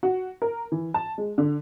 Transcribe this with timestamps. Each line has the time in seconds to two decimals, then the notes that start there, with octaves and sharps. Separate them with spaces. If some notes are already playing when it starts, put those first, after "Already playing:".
0.03 F#4
0.42 A#4
0.72 E3
0.94 A5
1.18 G#3
1.38 D3